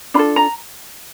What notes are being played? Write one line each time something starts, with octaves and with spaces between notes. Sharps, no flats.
D4 F4 A4 B5
A#5